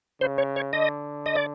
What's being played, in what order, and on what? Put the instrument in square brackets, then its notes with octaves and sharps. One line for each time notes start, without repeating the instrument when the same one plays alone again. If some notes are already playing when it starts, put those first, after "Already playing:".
[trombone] C#3 [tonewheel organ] C5
[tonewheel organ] C#5
C#5
[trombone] D3 [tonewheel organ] D#5
[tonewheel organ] D#5
D5